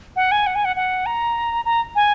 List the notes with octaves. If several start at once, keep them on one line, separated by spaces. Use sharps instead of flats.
F#5
G#5
F#5
G#5
F#5
F#5
A#5
A#5
G#5